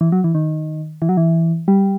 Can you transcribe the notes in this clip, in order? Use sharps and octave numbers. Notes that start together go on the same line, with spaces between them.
E3
F#3
E3
D#3
E3
F#3
E3
G3